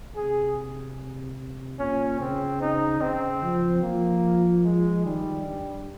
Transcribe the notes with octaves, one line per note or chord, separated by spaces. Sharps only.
C3 G#4
A#2 C#4
C#3 C4
D#4
C#3 C4
F3
F3 A#3
G#3
D#3 G3
G2